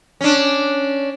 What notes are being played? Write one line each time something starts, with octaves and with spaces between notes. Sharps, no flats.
C#4 D4